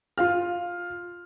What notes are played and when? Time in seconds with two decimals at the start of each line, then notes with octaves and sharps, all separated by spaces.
0.18 F4 F5 F6